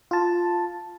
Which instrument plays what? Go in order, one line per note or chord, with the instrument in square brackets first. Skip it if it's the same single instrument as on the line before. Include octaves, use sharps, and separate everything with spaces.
[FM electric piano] F4 A5